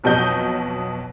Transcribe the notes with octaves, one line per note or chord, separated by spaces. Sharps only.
B1 F2 B2 F#3 D#5 G6